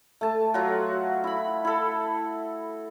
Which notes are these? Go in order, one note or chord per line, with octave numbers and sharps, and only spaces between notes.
A3 A5
F#3 F4 F#4
E4 B5
E4 A4